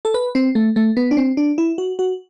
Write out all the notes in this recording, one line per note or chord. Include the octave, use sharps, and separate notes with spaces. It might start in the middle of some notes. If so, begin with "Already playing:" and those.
A4
B4
C4
A3
A3
B3
D4
C4
D4
E4
F#4
F#4